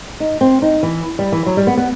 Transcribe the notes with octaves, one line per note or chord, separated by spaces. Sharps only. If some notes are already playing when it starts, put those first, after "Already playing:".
D#4
C4
D#4
E3
G3
E3
F#3
G3
B3
B3